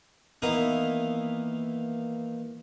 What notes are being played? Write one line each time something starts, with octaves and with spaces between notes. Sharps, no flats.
D#3 E3 A#3 B3 A#5 D#6